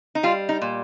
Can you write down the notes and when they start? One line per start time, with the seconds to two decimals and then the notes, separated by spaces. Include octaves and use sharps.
0.15 D#4
0.23 G3 F4
0.49 D#4
0.62 A#2